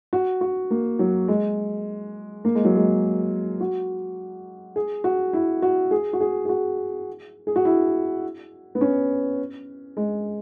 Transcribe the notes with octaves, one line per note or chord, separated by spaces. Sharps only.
F#4
F#4
A#3
F#3
G#3
A#3
G#3
F#3
G#3
F#4
G#4
F#4
E4
F#4
G#4
F#4
G#4
G#4
F#4
G#4
F#4
E4
B3
C#4
G#3